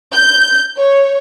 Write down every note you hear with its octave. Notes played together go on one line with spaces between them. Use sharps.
G6
C#5